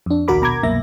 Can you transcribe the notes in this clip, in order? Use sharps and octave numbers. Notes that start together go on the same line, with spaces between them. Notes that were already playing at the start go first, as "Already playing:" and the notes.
F2 D4
A#1 D#2 F#4 A#4 B5 D6
B2 A#5 D6 G#6
C2 F#2 B2 A#3 E5 A#6